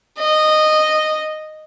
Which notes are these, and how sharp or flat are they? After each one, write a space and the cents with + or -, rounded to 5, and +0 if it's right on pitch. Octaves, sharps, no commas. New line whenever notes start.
D#5 -10